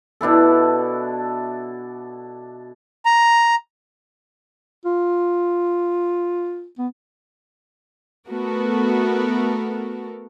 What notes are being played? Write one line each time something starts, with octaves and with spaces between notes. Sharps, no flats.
B2 D4 E4 A4
A#5
F4
B3
A3 B3 F#4 A4 A#4